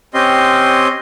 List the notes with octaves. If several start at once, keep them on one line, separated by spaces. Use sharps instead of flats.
C4 C#4 G4 D#5 C6